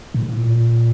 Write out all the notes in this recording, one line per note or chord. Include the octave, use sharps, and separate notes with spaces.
A2
A#2